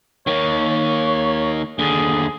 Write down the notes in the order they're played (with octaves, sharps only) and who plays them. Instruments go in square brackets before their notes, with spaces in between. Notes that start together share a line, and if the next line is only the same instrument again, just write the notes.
[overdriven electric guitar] D#3 A#3 [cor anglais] C#5
[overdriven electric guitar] D#2 D3 [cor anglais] G#4